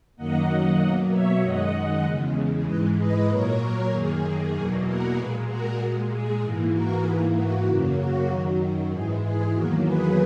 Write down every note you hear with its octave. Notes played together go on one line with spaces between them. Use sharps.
F#2 D#3 F#3 A#3 D#5 F#5
B2 F#3 A#3 D#5 F#5
C#5 E5
F#2 D#3 G#3 D#5 F#5
E2 C#3 G#3
G#2 E3 G#3 B4 D#5
B4 D#5
A#2 F#3 A#3 A#4 C#5
F#2 D#3 A#3 G#4
E2 B2 F#3 A#3 G#4
F#4 A#4
A#2 G#3 G#4 B4
F#4 A#4
A#2 G#3
G#4
G#2 E3 A#3
F#4 A#4
G#2 E3 A#3 G#4 B4
F#4
F#2 C#3 F#3 A#3
F#4
F#2 D#3 F#3
G#2 E3 G#3 G#4
G#4
E2 D#3 F#3 A#3 F#4 A#4
G#4 B4